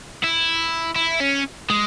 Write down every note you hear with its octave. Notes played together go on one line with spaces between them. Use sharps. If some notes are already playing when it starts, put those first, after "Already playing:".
E4
E4
C#4
G#3